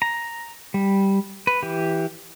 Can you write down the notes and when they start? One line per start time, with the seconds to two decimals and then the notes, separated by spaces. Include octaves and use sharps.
0.02 A#5
0.74 G3
1.47 B4
1.63 E3 G4